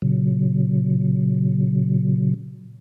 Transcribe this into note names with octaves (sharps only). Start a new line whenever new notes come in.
A#2 C#3 F#3